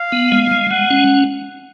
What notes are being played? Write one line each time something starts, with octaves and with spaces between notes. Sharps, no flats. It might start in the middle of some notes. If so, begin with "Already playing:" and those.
Already playing: F5
B3
G#3
G#3
G#3 F#5
C#4